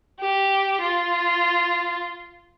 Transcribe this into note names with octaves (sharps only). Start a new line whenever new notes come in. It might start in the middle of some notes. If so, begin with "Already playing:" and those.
G4
F4